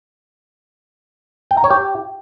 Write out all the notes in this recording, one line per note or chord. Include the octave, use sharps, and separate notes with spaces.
G5
A#5
C#5
G4